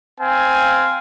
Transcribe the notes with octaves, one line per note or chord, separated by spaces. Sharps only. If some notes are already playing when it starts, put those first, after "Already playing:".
C4 F5 G#5